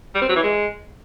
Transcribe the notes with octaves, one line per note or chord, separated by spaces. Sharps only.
G3
C4
F#3
E3
G#3